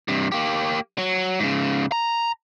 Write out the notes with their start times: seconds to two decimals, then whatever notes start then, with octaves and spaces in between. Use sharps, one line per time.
0.08 G2 C3
0.32 A#3 G4
0.98 F#3
1.39 G#2 C#3
1.92 A#5